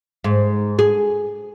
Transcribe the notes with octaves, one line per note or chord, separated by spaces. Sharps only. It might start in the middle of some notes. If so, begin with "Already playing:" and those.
G#2
G#4